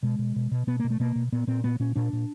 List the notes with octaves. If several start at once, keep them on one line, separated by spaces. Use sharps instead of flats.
B2 G#3
B2
B2
B2
B2 B3
B2 A#3
A3
B2 A#3
B2
A#2 B3
A#2 C4
A#2 B3
A#2 C#4
A#2 D4
A#2